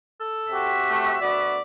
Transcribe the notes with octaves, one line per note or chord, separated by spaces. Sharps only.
A4
C4 F#4 G4 E5
A3
D2 B3 F#4 D5